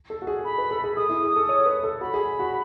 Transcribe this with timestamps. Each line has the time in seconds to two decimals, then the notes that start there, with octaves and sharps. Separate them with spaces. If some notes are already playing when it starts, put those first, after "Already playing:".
0.10 A4
0.22 F#4
0.27 G#4
0.45 B5
0.58 B4
0.71 A4
0.84 G#4
0.97 G#4 D#6
1.10 E4
1.23 G#4
1.36 A4
1.49 C#5
1.66 B4
1.83 A4
2.01 F#4 B5
2.14 G#4
2.39 F#4